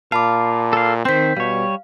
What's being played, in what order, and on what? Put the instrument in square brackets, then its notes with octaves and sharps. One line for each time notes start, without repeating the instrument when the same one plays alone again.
[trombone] A#2 [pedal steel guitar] F5 [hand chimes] A5 B5 D6
[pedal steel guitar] A4 F5
[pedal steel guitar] D#3 C4 [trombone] C5 [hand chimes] G6 B6
[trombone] B2 [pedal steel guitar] G3 C#5 [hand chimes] F5